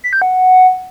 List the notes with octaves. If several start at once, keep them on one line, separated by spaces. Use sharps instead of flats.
B6
G6
F#5